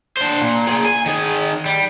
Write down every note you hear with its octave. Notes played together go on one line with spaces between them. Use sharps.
D4 C5
A#2
A#3 G#4
G#5
D#3 G#4
G3